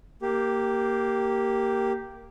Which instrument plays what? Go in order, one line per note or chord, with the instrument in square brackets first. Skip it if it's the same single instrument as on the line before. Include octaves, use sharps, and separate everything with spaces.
[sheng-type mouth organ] A#3 G4